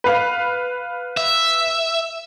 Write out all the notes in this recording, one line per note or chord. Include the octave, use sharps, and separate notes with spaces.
B4 F5
E5